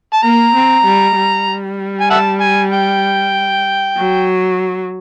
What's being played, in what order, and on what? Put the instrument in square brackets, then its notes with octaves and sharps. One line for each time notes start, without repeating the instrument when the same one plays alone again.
[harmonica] A5
[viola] A#3 [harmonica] A#5
[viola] C4
G3
G3
[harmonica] G#5
E5 F#5 A5
G#5
G5
[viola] F#3